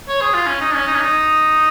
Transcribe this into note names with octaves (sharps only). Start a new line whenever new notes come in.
C#5
G#4
F4
C#4
D#4
C#4
D#4
C#4
D#4